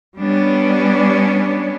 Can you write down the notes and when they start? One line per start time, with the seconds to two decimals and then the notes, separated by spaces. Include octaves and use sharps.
0.20 G3 B3 C#4 D4